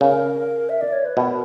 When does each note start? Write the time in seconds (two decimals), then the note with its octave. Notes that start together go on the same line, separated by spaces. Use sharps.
0.01 C#3 A#4
0.69 E5
0.81 D5
0.92 C#5
1.05 B4
1.16 B2 A#4